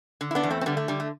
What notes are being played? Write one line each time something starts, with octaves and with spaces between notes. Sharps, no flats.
D3
E4
B3 D4
E2
A3 C4
C4
D3 G3 B3
A3
D3 G3
A3